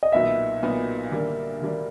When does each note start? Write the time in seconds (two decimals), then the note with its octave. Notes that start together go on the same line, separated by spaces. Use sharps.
0.03 D#5
0.12 B1 A#2 F#3 B3 D#4 E5
0.63 B1 A#2 F#3 B3 D#4
1.11 D3 G3 A#3 D4
1.61 D3 G3 A#3 D4